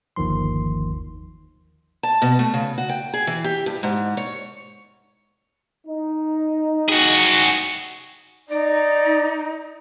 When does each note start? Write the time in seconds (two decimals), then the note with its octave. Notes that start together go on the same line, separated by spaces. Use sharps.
0.16 G1 D#2 D#3 F3 C6
2.03 A5
2.22 B2
2.39 A3
2.54 C#3
2.78 F#4
2.89 G5
3.13 G#4
3.27 E3
3.44 G4
3.66 G2
3.83 G#2
4.17 C#5
5.87 D#4
6.89 F#4 G#4
8.49 D#4 D5